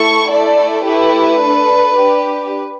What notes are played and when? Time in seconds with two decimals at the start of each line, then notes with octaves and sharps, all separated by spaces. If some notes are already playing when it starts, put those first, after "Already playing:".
Already playing: A3 E4 A4 C#6
0.30 A3 E4 A4 D5
0.85 A3 E4 G4 B4
1.40 D4 A4
1.95 D4 G4